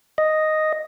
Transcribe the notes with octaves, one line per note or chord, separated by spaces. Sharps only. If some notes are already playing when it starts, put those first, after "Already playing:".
D#5